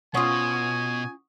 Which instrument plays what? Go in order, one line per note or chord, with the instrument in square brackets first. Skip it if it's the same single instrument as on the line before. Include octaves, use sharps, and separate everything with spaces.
[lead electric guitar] B2 [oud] C#4 F4 [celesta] F#5 C#6 D#6 [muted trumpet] G#5